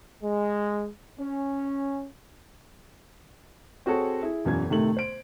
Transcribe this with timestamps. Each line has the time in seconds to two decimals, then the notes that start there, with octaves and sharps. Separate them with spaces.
0.22 G#3
1.19 C#4
3.86 C4 F#4 G#4 A4 C#5
4.23 E4 G#4
4.45 E1 F#2 E3 F#3 G#6
4.69 A2 C3 D#3 A3 F#7
4.97 C5 D7